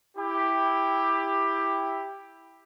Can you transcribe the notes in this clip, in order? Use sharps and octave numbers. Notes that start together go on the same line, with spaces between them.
E4 G4